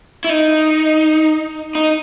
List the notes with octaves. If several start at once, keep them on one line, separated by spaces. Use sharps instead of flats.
E4
D#4
D#4